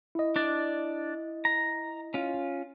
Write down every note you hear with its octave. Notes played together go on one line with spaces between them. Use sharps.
E4 D#5
D4 D5
A#5
C#4 F4